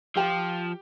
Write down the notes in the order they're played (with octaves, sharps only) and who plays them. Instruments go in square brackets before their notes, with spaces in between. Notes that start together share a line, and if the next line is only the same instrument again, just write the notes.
[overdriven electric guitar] F3 [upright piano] G4 G5